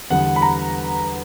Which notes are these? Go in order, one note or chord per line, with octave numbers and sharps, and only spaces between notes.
E2 D3 G3 B3 F#5
B5
A#5